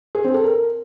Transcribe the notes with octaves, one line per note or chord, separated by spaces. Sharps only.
G#4
C4
A4
A#4